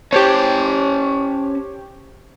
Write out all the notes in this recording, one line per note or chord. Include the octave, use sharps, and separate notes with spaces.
C#4 G4 C5 C#5 A5